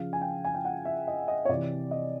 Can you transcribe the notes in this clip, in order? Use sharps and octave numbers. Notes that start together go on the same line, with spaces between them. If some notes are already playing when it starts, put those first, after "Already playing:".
Already playing: C#3 F3 F5
G#5
G5
G#5
G5
F#5
E5
D#5
D#5
C#5
C3 E3 D5
D#5